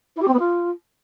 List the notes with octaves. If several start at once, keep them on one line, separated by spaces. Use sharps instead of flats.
E4
G4
C4
B3
F4